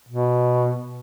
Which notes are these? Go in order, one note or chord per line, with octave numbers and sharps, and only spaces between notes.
B2